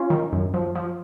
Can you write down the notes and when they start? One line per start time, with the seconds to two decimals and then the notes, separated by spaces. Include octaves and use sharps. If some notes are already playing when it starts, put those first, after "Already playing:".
Already playing: C#4 F4
0.10 D#3
0.33 F#2
0.54 F3
0.75 F3